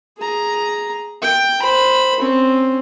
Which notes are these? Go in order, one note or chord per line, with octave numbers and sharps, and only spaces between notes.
G#4 A#5
G5
C5 B5
C4 C#4